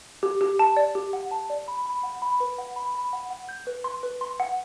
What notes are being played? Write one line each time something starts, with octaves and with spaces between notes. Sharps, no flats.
G4
G4
A5
D5
G4
F#5
A5
D5
B5
B5
F#5
B5
B4
F#5
B5
B5
F#5
F#5
G6
B4
C6
B4
C6
F#5